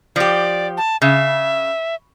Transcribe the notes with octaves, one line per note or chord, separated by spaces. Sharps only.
F3 G4 D5
A5
C#3 E5